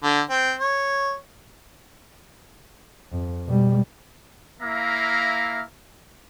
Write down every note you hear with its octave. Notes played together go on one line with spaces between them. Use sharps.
D3
C4
C#5
F2
B2 G3
A#3 E4 E5 F5 A#5